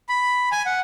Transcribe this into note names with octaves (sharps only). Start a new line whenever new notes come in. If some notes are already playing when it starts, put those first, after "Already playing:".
B5
G#5
F#5